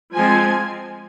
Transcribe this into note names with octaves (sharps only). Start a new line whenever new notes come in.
F3 G#3 C4 G#5